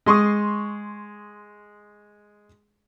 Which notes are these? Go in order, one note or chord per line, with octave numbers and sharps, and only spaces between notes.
G#3 C6 C#6 D#6